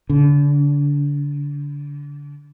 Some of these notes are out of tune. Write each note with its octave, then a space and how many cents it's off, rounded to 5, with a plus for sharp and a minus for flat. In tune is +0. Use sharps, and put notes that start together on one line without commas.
D3 -30